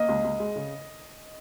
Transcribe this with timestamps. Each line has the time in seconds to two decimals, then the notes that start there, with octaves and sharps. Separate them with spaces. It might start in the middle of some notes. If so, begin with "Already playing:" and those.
Already playing: A#3 D#5
0.08 C#2
0.24 C#2
0.39 G#3
0.56 C#3